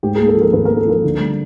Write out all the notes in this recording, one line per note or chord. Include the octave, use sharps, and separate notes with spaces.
G#2 G4
G#4
A#3
A4
F3 A#4
G#1 B4
A#3 A#4
A4
F3 A#4
D3
G3